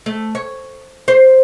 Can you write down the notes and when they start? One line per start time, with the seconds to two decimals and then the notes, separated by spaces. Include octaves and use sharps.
0.06 A3
0.35 C#5
1.08 C5